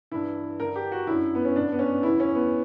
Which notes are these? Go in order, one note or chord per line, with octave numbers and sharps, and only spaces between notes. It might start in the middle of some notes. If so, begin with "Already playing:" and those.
G2 E3 E4
G2 D3 A#4
G4
F#4
F#2 D3 E4
B3
C#4
G2 D3 D4
B3
C#4
E2 C#3 E3 E4
C#4
B3